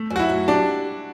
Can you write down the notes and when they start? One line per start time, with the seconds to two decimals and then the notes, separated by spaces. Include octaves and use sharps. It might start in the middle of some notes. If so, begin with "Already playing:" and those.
Already playing: A3
0.10 F#2
0.16 F#4
0.19 E4
0.30 F#3
0.48 D4 G4